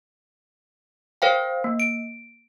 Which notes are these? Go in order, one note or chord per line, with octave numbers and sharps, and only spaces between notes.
A#4 C5 F5 G5
A#3
D7